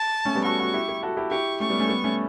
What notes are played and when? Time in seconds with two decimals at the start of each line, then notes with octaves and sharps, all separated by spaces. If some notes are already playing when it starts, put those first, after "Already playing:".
Already playing: A5
0.25 A3 C#4
0.35 G3 B3
0.44 F#4 A4 C#6
0.59 F#4 A4
0.74 E4 G4
0.88 E4 G4
1.03 F#4 A4
1.17 E4 G4
1.31 E4 G4 C#6
1.60 A3 C#4 C#6
1.70 G3 B3
1.79 A3 C#4
1.89 G3 B3
2.04 A3 C#4